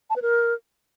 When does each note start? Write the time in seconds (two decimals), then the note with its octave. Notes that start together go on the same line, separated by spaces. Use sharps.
0.10 A5
0.16 B4
0.22 A#4